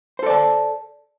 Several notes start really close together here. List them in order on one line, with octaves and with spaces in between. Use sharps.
C5 A4 D5 A5